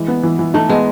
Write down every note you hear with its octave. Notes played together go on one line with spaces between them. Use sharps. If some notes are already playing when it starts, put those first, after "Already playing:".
Already playing: E3 G#3
B3
E3
E3
A3 D#4
G#3 B3